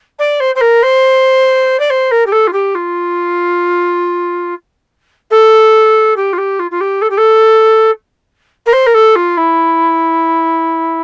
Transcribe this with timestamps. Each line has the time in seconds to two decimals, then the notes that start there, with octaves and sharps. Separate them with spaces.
0.19 D5
0.40 C5
0.55 C5
0.60 A#4
0.82 C5
1.79 D5
1.90 C5
2.11 A#4
2.26 G4
2.32 A4
2.47 F4
2.53 G4
2.75 F4
5.30 A4
6.16 G4
6.33 F4
6.38 G4
6.59 F4
6.71 F4
6.80 G4
7.01 A4
7.10 G4
7.17 A4
8.66 A#4
8.72 C5
8.86 A#4
8.94 A4
9.15 F4
9.37 E4